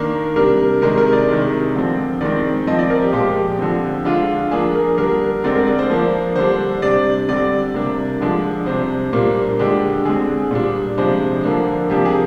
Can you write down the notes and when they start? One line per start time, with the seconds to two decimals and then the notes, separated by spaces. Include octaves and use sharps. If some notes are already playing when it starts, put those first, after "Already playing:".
Already playing: D#3 A#3 D4 A#4
0.36 C3 G3 D4 A#4
0.82 C3 D#3 G#3 D4 A#4
0.98 A#4
1.13 D5
1.29 C3 D#3 G#3
1.75 D3 F3 C4
2.21 D#3 G#3 C4 D5
2.67 F3 C4 D#5
2.79 D5
2.90 A#4
3.02 G4
3.13 A#2 F3 G#3 G4
3.59 D3 F3 C4
4.05 D3 G#3 D4 F4
4.51 F3 A#3 D4 G#4
4.75 A#4
4.98 D3 G3 D4 A#4
5.44 D3 G#3 C4 D5
5.56 A#4
5.67 D5
5.79 C5
5.90 F3 A#3 D4
6.36 D3 G3 D4 C5
6.82 C3 G3 D4 D5
7.29 D3 G3 C4 D5
7.74 C3 G3 A#3 D4
8.20 D3 F3 G#3 D4
8.66 C3 G3 D4 C5
9.13 A#2 G3 A#3 D4
9.59 D3 G#3 D4 G4
10.05 D3 G#3 C4 G#4
10.51 A#2 G3 D4
10.98 C3 F3 G#3 D4 C5
11.43 D3 F3 A#3 D4
11.90 C3 F3 A#3 D4 G4
12.05 G#4